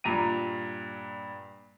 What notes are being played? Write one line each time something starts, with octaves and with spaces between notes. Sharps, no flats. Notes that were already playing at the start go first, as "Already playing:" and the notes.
G2 A#2 A#5 D#7